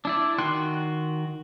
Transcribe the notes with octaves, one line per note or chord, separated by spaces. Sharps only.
D4 E4 D5
D#3 F#4 G5 C6 F#6